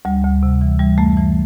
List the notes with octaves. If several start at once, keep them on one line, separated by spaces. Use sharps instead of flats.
D2 G3
D2
C3
E3
E3 G3
F#2 A3
E3